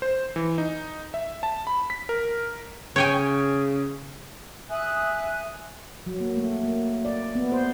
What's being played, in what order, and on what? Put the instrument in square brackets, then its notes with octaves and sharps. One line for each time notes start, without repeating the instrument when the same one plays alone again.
[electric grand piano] C5
E3
D#4
E5
A5
B5
B6
A#4
[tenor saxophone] C#3 [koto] C#5 G5 G#5
[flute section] E5 G#5 D#6 F#6
[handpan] F#3
A#3
A3
A#3
D5
B3
C5